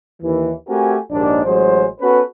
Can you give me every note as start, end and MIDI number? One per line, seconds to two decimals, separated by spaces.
0.23 0.52 39
0.23 0.52 52
0.69 0.96 57
0.69 0.96 60
0.69 0.96 66
0.69 0.96 67
0.69 0.96 70
0.69 0.96 80
1.11 1.43 34
1.11 1.43 39
1.11 1.43 44
1.11 1.43 62
1.45 1.86 33
1.45 1.86 54
1.45 1.86 56
1.45 1.86 72
2.01 2.21 59
2.01 2.21 61
2.01 2.21 66
2.01 2.21 69
2.01 2.21 71